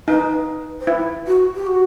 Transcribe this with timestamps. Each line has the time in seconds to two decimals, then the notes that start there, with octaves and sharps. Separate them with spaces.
0.08 D#4 B4
0.80 C5
0.87 E4 B4
1.27 F#4
1.56 G4
1.67 F#4